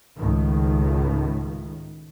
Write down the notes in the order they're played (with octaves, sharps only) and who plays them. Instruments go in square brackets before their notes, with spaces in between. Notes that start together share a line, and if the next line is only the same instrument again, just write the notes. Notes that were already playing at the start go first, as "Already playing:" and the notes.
[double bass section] C#2 A2 D#3